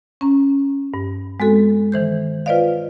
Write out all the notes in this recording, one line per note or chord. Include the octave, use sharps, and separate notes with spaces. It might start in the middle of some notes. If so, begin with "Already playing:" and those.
C#4 A#5
G2
G#3 B3 C4 F#4 A4
D#3 E3 C5 G6
F4 B4 C5 D5 D#5 F5